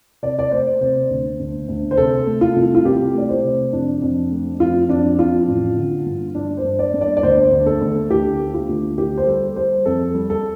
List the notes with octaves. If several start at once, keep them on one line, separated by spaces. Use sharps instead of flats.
C3 D5
D5
A3 C5
C3 C5
D2
D2
D2
C5
C3 A4
A3
F4
C2
F4
C2 G4
A3 D5
C5
C3
F2 D4
F2
A3
F2 F4
F2 D4
F2 F4
A1
D3
G2
G2 D4
C5
G2
D5
G2
D5
D5
D2 C5
D2
A4
D2
D2 G4
A3
F4
D2
D3 G4
C5
G3 A4
G3 C5
F2 A4
G3
A4